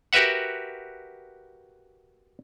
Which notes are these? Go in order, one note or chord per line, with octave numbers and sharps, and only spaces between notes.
F#4 G4 A#4 B4 E5 F#5